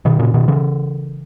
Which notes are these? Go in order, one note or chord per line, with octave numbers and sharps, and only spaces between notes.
B2 D#3
A#2 C#3
B2 D#3
C#3 E3